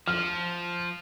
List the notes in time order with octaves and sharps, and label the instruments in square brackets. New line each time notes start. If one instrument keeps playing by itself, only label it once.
[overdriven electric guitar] F3 [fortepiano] F6